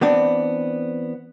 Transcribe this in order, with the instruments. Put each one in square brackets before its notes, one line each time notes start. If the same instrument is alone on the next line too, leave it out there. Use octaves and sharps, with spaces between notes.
[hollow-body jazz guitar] E3 B3 C4 D4